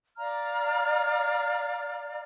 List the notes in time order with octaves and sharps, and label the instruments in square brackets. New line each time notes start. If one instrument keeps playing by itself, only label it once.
[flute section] D5 F5 A#5 F6